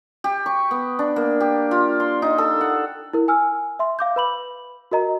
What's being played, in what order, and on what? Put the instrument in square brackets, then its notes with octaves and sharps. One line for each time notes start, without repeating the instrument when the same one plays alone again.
[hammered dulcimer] G4
C#6
B3
D4
A#3
G4
F4
C6
D#4
A4
F#5
[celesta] E4 A#4
G#5 E6 F6
E5 C6
F5 D6 G6
B4 B5 F#7
F#4 A#4 D#5 A#5